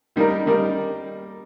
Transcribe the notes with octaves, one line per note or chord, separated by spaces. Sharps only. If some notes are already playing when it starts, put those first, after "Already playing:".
D#3 G3 A#3 D#4 A#4
D#3 G3 A#3 D#4 A#4